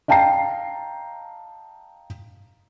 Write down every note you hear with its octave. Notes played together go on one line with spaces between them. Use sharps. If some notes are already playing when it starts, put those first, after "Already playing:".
D#5 F5 G5 A5 A#5 C7